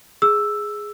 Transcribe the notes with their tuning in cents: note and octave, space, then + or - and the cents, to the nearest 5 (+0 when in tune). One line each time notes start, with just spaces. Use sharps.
G#4 +0 E6 +0